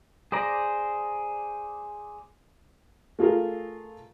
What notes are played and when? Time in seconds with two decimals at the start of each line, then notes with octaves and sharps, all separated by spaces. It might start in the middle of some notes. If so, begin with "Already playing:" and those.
0.32 G#4 C5 D5 A#5
3.19 A3 F4 G#4 A#4